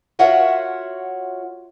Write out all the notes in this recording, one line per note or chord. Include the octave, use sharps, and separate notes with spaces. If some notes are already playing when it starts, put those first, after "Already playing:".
F4 F#4 A#4 C#5 E5 F#5